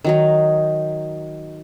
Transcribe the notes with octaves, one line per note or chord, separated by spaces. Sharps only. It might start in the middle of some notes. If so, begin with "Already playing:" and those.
D#3 F#3 D#4